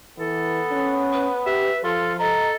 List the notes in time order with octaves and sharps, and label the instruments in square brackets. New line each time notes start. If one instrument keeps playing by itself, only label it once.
[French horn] E3 [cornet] B3 [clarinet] A4
[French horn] C#4
[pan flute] B4
[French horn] G4 [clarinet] E5
[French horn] F3 [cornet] F4 [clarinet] A4 [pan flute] C6
[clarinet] A4 [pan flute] D#5 [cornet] A#5